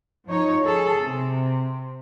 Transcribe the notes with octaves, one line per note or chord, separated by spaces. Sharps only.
F3 D#4 C#5
G#4 A4
C3